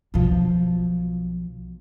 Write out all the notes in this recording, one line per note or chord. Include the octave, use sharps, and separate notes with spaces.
B1 F3